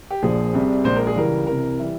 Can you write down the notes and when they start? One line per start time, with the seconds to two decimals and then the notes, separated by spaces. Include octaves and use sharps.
0.10 G4
0.23 A#1 A#2 F3 G#4
0.53 C2 C3 G3
0.84 A#1 A#2 G#3 C5
0.96 A#4
1.07 G#4
1.16 C#2 C#3 E3 G3 A#4
1.47 C2 C3 E3 A#4
1.79 E3 G3 E5